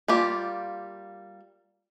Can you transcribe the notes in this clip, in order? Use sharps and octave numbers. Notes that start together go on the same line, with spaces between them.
G3 A#3 F4 G4